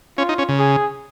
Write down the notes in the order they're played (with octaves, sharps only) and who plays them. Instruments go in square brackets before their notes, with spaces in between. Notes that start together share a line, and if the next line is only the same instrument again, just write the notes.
[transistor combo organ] C#4 [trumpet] F4
[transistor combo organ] D#4
C#4
C#3
[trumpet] G#4